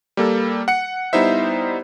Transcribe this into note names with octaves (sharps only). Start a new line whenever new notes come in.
G3 A#3 A4
F#5 C#7
G3 B3 D#4 E4 C5 E5